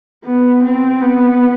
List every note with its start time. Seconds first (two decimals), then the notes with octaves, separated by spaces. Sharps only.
0.24 B3
0.64 C4
1.01 B3